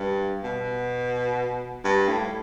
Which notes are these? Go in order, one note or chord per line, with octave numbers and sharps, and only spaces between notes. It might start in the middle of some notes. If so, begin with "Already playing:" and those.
Already playing: G2
B2
G2
A2